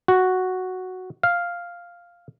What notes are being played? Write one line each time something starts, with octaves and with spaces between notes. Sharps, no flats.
F#4
F5